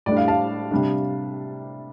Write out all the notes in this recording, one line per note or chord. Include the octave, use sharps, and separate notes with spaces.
A2 G3 D4 D5
F5
F5 A5
C3 G3 D4